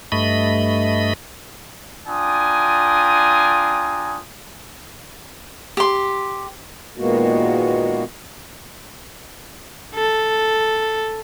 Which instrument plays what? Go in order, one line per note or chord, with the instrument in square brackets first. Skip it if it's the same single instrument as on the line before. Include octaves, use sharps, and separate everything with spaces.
[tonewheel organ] G2 A3 D#5 B5
[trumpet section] D4 F4 G5 G#5 A#5 D#6
[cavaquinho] G4 C6
[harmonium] A#2 D#3 G#3 A#3 B3 F#4
[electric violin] A4